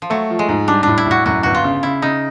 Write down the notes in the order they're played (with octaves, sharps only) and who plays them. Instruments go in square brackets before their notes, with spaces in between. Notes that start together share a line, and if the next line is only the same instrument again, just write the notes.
[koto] F3
[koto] F#3 [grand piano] A3
[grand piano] F3
[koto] G#3
[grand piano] G#2
[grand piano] G3 [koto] D4
[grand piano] A2 [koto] D4
[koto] E4
[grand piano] A2 [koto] F#4
[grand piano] F#2 [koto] F#4
[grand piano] G1 [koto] F#4
[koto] F4
[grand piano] C#3
[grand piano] C#3 [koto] E4
[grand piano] C#3 [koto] D#4